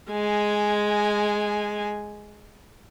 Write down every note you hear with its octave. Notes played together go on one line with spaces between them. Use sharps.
G#3 G#5